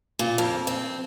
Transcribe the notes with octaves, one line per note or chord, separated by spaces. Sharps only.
A#2
F2
C4